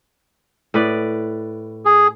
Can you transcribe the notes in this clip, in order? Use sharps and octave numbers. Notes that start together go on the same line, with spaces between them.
A2 B4 D5
G#4